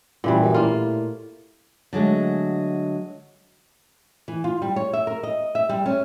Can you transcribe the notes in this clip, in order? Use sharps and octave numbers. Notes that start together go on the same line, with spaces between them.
A1 A#2 E3 G3
F#2
A2 A#3 F4
D3 F#3 G#3 A3
E3
F4
G3
C#5
E5
A#4
D#5
E5
G3
C#4